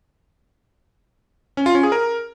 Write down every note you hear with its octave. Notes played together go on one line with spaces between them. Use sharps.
C#4
F4
C#4
G#4
A#4